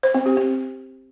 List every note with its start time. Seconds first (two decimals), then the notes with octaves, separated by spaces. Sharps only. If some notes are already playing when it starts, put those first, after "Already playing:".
0.03 C5
0.15 C4
0.26 G4
0.37 C4